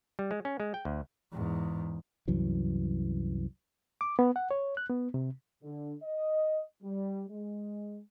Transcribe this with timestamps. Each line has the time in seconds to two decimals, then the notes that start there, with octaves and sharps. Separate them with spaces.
0.19 G3
0.31 G#3
0.45 C#4
0.60 G#3
0.74 G5
0.85 D2
1.32 E2 G#2
2.28 C2 F#2 E3 F#3
4.01 D6
4.19 B3
4.36 F#5
4.51 C#5
4.77 F#6
4.89 B3
5.14 C3
5.63 D3
6.03 D#5
6.82 G3
7.29 G#3